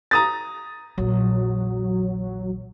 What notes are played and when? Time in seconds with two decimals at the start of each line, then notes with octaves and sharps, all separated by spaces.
0.11 A#5 D#6 A6
0.98 A#1 E2 F#3